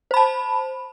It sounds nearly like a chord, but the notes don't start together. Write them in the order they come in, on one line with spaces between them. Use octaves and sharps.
C5 B5 A5